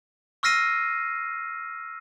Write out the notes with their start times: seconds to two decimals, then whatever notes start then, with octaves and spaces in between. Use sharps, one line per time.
0.43 C#6 E6 F6 A#6 C7 D#7